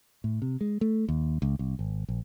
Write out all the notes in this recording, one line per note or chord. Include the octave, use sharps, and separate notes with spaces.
A2
C3
G#3
A3
D#2
C#2
C2
G#1
A#1